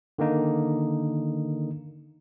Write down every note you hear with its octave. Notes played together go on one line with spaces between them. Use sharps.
D3 D#3 A#3 D#4